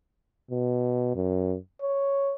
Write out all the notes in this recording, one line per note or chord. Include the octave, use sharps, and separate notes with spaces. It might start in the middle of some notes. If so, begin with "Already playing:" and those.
B2
F#2
C#5